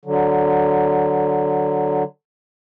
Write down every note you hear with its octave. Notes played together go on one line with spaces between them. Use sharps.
D3 F#3